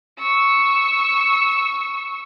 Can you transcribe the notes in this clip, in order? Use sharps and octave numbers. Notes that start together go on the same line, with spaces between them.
C#6 E6